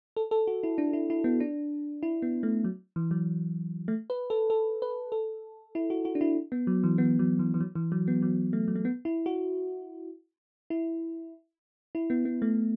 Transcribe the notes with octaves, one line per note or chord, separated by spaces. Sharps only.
A4
A4
F#4
E4
D4
E4
E4
B3
D4
E4
B3
A3
F#3
E3
F#3
A3
B4
A4
A4
B4
A4
E4
F#4
F#4
D4
E4
B3
F#3
E3
B3
F#3
E3
E3
F#3
E3
F#3
B3
F#3
A3
F#3
A3
B3
E4
F#4
E4
E4
B3
B3
A3